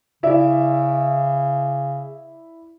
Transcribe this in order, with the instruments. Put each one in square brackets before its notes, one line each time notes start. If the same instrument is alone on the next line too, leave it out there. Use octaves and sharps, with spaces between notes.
[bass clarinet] C#3 [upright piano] E4 D5 E5